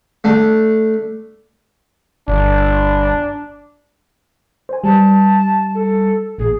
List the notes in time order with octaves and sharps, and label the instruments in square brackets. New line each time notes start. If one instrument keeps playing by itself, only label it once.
[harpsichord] A3 D4
[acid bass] G1 [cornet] D4
[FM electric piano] C5 G#5
[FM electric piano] G3 [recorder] A5
[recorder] A4
[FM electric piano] A1 A#2 [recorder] G#4